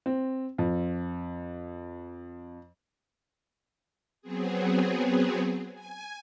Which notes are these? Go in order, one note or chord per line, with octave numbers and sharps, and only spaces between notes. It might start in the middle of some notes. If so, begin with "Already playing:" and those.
C4
F2
F#3 B3 C4 G#4
G#5